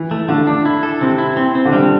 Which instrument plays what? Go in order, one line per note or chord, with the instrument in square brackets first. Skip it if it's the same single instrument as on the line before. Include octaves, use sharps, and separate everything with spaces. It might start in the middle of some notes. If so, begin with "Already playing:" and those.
Already playing: [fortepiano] E3
[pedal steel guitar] A3
[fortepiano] D3 [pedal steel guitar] A3
[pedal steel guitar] D4
E4
A4
[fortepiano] C3 [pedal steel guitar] C4
[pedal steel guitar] E4
C4
C4
[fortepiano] D3
[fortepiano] C3 [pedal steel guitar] G3